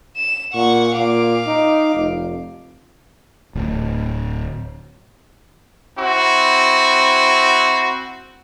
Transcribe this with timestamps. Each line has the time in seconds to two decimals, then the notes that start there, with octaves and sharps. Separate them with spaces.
0.17 E7
0.54 A#2 F#5 C#6
0.96 A#2 F5 D6
1.47 D#4
1.94 F1
3.55 D1
5.98 C4 E4 F#4